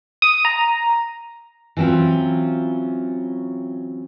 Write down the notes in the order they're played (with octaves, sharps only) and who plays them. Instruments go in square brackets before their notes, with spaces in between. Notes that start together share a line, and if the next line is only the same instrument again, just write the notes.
[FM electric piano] D#6
A#5
[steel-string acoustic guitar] E3 F#3 C4 C#4 F4